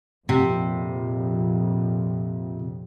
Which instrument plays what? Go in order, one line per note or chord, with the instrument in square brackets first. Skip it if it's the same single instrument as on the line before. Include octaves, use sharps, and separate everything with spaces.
[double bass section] A#1 F2 [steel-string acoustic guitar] C3